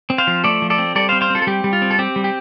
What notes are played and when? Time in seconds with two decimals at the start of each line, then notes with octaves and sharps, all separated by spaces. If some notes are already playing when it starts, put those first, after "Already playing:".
0.10 C4
0.18 C5 F5
0.27 F3
0.44 A3 A4 D5
0.62 F3
0.70 A4 D5
0.78 C4
0.95 G3 A4 D5
1.09 C5 F5
1.12 C4
1.21 C5 F5
1.30 C4 F4 A4
1.42 A4
1.47 G3 G4
1.64 G3
1.73 F4
1.82 C4
1.91 A4
1.99 C4 G4
2.16 G3
2.24 G4